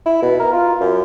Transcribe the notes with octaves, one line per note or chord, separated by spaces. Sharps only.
E4
B2
A#4
F4
F#2